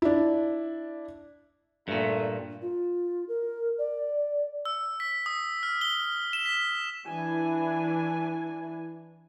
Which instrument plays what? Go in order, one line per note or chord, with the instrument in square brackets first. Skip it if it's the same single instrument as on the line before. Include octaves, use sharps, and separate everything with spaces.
[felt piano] D4 E4
[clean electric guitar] G2 A#2 [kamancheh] A3
[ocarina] F4
A#4
D5
[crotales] E6
B6
D#6
F6
G7
E7
B6
[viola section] E3 D4 G#5 [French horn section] E4